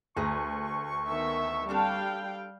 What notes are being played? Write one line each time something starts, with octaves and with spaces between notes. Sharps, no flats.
D2 G#4 B4 A#5 C#6
D#3 B3 E5
G3 C4 D4 A4 F5 G5